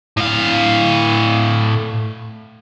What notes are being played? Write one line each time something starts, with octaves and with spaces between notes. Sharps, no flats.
A2 F5